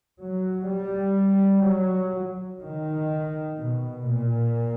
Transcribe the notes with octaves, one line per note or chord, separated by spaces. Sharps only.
F#3
G3
F#3
D#3
B2
A#2